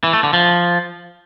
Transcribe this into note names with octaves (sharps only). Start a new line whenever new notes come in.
E3
A3
D3
F3